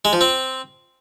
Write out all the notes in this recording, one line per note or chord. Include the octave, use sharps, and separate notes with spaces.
G#3
F3
C4